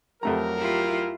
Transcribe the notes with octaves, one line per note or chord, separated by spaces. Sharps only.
F2 F#3 A3 G4 A#4 F#5 A#5
E4 F4 G4